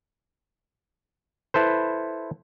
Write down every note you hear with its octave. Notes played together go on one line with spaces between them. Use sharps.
E4 A4 B4 C5